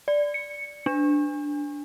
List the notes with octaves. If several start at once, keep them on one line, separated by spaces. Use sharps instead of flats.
D5
C#7
D4